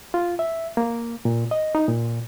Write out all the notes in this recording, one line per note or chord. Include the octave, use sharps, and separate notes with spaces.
F4
E5
A#3
A#2
D#5
D#4
A#2